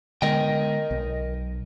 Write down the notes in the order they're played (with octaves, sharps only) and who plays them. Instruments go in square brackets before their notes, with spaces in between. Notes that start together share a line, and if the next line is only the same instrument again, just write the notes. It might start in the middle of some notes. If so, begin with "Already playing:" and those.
[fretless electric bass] D3 G#3 B3 [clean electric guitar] A#4 D#5 G5
[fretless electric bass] B1